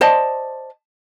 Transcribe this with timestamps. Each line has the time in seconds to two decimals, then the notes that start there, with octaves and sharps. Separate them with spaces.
0.01 C5 D5 D#5 A5